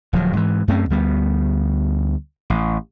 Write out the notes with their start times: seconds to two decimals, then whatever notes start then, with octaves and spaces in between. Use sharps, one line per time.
0.13 D1 F3 F#3
0.33 G#2 E3
0.68 F#2 A3 C4 C#4
0.90 D2 G3 B3
2.50 A1